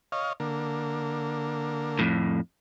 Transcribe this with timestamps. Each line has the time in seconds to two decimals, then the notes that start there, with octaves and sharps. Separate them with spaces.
0.12 C#5 D#5 F5
0.40 D3 A#3
1.99 F2 A2